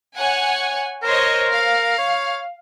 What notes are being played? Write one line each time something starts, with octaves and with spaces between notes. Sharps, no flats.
C#5 F#5 G#5
A#4 C5 C#5 D#5
F5
C#5